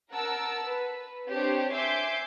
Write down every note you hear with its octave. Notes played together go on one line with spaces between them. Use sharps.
A#4 F#5 A5 E6
B4
C4 D4 G4 C5 C#5
E5 G#5 C6 D6 E6 G6